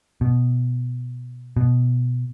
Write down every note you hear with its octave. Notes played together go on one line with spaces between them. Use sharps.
B2
B2